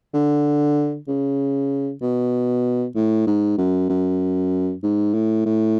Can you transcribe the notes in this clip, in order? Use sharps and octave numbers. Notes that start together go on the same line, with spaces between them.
D3
C#3
B2
A2
G#2
F#2
F#2
G#2
A2
A2